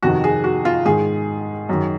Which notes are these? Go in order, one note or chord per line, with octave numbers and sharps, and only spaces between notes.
F2 C3 D#3 F#4
G#4
F#4
F4
G#2 D#3 G#4
F#2 D#3